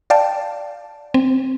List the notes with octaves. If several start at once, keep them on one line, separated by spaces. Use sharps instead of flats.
D5 F5 G5 A5
C4